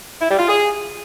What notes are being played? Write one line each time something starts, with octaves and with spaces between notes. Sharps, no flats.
E4
G3
F4
G#4